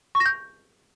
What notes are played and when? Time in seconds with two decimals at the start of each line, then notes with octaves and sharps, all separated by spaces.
0.15 C#6
0.20 A#6
0.26 G6